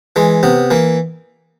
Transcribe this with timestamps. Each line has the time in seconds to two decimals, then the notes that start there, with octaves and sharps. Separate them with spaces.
0.16 E3 G#3
0.43 C3 B3
0.71 E3 A#3